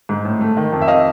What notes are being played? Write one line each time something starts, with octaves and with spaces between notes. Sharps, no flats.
G#2
A2
A3
D#3
F2
E5
D#5 F5